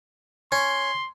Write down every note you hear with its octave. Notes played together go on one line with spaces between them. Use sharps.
C#4 C6